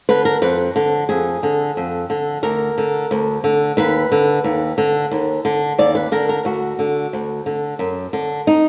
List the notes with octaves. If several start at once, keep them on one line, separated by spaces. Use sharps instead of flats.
D3 B4
A#4
F2 B4
D3
F2 G#4
D3
F2
D3
D2 A#4
D3
D2
D3
D#2 B4
D3
D#2
D3
D#2
D3
D#2 D5
B4
D3 A#4
A#4
D2 F#4
D3
D2
D3
F#2
D3
D#4